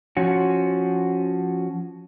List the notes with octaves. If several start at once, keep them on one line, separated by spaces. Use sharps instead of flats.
F3 C#4 F#4